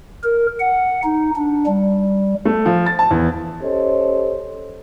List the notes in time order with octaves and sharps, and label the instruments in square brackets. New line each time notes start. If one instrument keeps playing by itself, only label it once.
[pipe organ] A#4
F#5
D#4
D4
G3
[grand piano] A3
F3
A6
A5
E2
[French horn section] C#4 G4 A4 C5 C#5 D#5